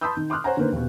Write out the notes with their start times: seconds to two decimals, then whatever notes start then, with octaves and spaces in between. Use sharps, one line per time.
0.01 A5 B5 C6 D#6 E6 G6
0.17 D#3
0.30 C6 D6 D#6 F6 F#6
0.44 C5 C#5 F#5 G#5 A#5
0.57 D3 D#3 A#3 B4 C5
0.73 D#1 B2